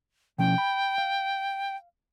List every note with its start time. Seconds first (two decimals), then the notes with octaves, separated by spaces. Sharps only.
0.38 B2 F3 C#4 G5
0.58 B5
0.98 F5